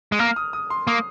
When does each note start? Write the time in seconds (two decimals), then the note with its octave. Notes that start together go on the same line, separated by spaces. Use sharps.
0.12 G#3
0.19 A#3 F6
0.36 D#6
0.53 D#6
0.70 C6
0.87 A#3 D#6